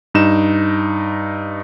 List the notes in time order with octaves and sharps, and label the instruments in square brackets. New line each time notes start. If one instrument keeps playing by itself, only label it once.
[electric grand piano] G2 D#4 E7